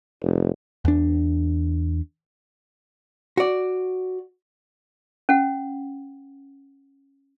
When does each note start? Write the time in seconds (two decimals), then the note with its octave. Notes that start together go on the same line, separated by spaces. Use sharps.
0.23 F1
0.85 E2 D4
3.37 F#4 D5
5.29 C#4 F#5